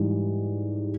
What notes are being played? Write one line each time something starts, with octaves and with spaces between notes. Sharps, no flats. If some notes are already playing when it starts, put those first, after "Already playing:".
Already playing: G#2 E3 G3